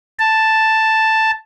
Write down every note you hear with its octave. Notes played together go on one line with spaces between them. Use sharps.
A5